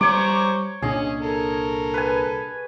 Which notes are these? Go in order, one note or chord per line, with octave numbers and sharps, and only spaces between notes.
G3 C5 C#5 A#5 C#6 D6
C2 A#2 C#4 D4 G#4 D#5
A4 A#4
B4 G#5